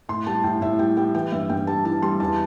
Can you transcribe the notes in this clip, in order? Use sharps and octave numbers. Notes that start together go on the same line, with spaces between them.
A2 C6
G3 A5
A2 G5
A2 E5
G3 G5
G3 G5
E3 G5
G2 E5
G2 G5
G3 A5
E3 A5
G3 C6
E2 A5